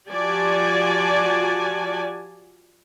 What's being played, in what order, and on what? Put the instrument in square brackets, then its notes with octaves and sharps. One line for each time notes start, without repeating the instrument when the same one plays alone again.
[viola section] F3 F#4 G4 D5 G#5 A5